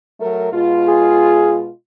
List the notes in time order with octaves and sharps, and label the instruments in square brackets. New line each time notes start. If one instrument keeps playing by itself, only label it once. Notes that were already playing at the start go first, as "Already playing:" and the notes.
[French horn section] F#3 A3 A#4
B2 G#3 F4
[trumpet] G#4